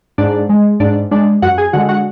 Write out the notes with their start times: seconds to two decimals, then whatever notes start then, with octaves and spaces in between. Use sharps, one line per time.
0.18 G#2 D4 D5
0.49 G#3
0.80 G#2 D4 D5
1.11 G#3 D4 D5
1.42 F#2 F#4 F#5
1.58 G#4 G#5
1.73 D3 G#3 F#4 F#5
1.89 F#4 F#5